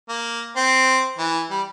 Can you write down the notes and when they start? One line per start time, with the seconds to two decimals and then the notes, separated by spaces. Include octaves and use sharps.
0.09 A#3
0.57 C4
1.18 E3
1.50 G3